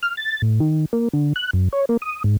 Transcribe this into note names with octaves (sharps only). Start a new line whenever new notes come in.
F6
A6
A2
D#3
A#3
D3
F#6
F#2
C#5
A#3
D#6
G#2